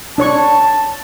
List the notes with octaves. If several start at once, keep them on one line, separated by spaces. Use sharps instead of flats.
D4 C#5 A5 C#6